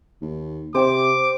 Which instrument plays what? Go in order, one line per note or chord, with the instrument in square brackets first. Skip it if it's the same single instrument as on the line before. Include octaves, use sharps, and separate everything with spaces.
[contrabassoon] D#2
[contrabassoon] C3 [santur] C5 G5 [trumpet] D6